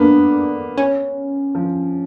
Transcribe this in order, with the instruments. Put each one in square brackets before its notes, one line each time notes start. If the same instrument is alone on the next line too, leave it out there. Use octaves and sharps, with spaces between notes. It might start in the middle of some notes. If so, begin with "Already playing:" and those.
Already playing: [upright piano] A#3 B3 [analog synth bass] D4
[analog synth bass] C#4
[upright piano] F3